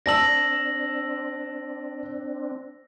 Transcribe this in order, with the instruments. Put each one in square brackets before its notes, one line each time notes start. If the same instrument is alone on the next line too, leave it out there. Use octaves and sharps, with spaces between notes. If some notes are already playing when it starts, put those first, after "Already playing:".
[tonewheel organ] C4 D4 [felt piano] D5 A5 E6 [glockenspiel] A#6 F#7